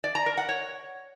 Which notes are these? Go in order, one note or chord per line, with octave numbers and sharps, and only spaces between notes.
D5
A#5
A#4
F#5
C#5